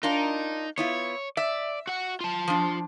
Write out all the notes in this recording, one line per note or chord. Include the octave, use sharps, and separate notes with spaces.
D4 D#4 F4 A#4
B3 E4 F4 C#5
D5 E5
F#4 F#5
F4 A5
F3 D4